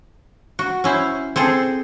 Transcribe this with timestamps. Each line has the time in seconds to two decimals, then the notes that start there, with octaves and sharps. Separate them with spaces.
0.59 F#4
0.84 C#4 E4 C5
1.36 C4 G#4 A4 C5